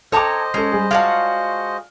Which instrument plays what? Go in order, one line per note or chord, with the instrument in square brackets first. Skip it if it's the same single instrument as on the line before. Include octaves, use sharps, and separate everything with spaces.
[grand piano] A4 G5 D6 [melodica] C5 D#5 [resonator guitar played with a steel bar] C#5 A5 A#5
[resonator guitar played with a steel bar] G#3 [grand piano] C#4 A4 [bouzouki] A#5
[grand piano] G3 G#4
[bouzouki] G#3 F4 F#4 [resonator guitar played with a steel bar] D5 F5 [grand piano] A5 F6